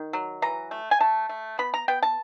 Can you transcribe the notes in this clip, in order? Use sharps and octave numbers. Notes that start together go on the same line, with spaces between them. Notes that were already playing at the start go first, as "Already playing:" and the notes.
Already playing: D#3
F#3
E3 A#5
A3
G#5
A3 A5
A3
B3 B5
A#5
B3 G5
A5